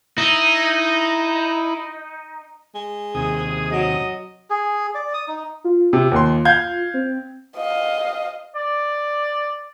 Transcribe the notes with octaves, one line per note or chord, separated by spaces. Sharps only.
D#4 E4
G#3
D#2 C3 G#4 D#6
F#3 D#5
G#4
D5
D#6
D#4
F4
C3
D#2 C6
F5 G6 G#6
C4
D#5 F5
D5